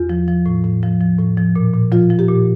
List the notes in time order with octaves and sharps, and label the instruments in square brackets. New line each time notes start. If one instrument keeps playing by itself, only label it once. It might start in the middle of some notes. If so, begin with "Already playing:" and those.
Already playing: [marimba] E2 F4
F3
F3
A2
A2
F3
F3
A2
F3
A#2
A#2
F3 F4
F3
G4
A#2